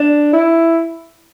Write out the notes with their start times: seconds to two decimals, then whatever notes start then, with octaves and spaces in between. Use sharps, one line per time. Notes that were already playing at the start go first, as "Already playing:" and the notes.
Already playing: D4
0.33 E4